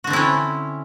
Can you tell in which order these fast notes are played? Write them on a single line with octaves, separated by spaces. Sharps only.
F#4 D3 C4 E4 C#4